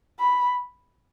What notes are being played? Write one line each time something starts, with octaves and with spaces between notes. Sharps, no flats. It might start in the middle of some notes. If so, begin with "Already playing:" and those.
B5